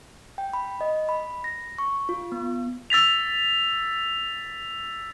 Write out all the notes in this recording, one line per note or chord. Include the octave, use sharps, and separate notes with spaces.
G5
B5
D#5
B5
A#6
C#6
F4
B3
E6 A6 B6 F7